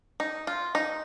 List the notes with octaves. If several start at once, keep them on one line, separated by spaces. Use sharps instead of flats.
D#4
F4
D#4